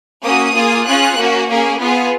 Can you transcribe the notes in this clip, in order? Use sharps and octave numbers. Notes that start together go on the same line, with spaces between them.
A#3 C#4 F#4 D#6
A#3 F4 G#4
C#4 F4 G#4 F#6
A#3 C#4 F#4
A#3 C#4 G#4
B3 F4 G#4